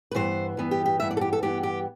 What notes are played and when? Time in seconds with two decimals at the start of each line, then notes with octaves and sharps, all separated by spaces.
0.11 B4
0.15 G2 E3 B3 C5
0.57 G2 E3 B3
0.71 G4
0.85 G4
1.00 G2 E3 B3 E5
1.11 D5
1.17 A4
1.21 G4
1.33 A4
1.42 G2 E3 B3 G4
1.63 G4